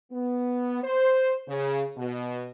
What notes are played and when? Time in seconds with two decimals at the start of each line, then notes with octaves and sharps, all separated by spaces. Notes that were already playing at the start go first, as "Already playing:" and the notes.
0.12 B3
0.83 C5
1.49 C#3
1.97 B2